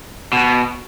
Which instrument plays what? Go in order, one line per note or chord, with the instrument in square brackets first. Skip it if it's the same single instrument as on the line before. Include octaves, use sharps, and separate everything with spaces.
[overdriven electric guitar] B2